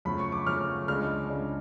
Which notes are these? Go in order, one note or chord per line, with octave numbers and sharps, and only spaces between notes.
F#2 C#3 F3 A3 B5
C#6
D6
F#2 C#3 F3 A3 F6
C#2 C#3 G#3 D4 F6
C#2 C#3 G#3 D4